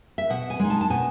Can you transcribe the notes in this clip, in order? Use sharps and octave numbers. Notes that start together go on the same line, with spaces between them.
E5
B2 F#5
G#5
G#3 D#4
A5
A5
B2 G#5